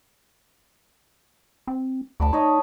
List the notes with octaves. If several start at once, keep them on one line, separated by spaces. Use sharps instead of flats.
C4
D2 A5 B5 D6
D#4 C#5 D#5 B5